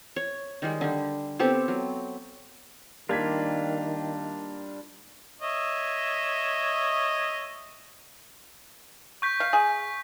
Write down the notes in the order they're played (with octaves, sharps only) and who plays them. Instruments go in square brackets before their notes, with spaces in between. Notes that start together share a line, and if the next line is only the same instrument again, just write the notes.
[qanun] C#5
D#3 G3 G#3
D3 G3
B3 C4 G4 A4
F#3
[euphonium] D#3 [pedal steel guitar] G3 D4 F4 [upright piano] A#3 G#6 B6
[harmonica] C#5 D#5 E5
[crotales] C#6 G6 B6
[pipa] F5
G#4